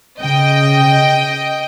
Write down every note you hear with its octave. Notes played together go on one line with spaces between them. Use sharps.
C#3 D#5 G5